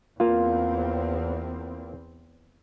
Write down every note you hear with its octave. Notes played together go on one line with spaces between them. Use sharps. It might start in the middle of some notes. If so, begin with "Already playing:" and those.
E2 A#3 C4 F4